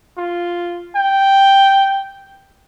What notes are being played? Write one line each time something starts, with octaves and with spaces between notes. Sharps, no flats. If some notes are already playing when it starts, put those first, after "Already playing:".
F4
G5